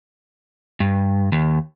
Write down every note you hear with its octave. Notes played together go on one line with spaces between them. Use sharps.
G2
D#2